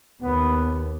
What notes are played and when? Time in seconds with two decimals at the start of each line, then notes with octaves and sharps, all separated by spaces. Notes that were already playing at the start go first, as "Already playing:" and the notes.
0.22 D#2 B3